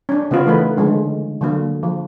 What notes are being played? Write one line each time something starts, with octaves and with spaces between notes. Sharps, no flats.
C#4 D4
C#3 B3 C#4 F4 B4
E3 A3 D#4 A#4 B4
D3 F3 G#3 C#4
D3 F#3 A#3
F3